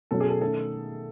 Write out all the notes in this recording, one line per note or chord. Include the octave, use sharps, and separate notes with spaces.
B2 F#3 C#4 A4
G#4
A4
D#3 A3 C#4 A4